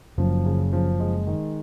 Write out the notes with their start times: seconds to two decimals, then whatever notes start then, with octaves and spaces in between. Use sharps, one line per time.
0.18 F#1 F#2 F3
0.45 C#3
0.73 F3
1.00 G#3
1.27 D#3